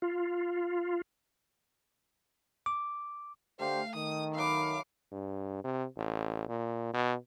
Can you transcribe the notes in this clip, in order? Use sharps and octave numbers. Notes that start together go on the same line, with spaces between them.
F4
D6
D3 A3 G4 C5 F5
D#3 D#6
F#3 B4 E5 F5 D6
G2
C3
A1
A#2
B2